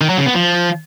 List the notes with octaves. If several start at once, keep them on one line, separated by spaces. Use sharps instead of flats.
D#3
F#3
C#3
B3
F3